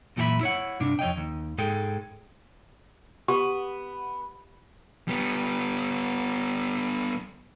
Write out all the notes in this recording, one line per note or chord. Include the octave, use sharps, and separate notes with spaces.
F#2 A#2 E3 G4 E5 B5
E4 C#5 F#5
G2 C3 D4
F2 C#5 D#5 G5
D#2
G#2 G#3 G#4 A4 G5
B3 G4
G3 B3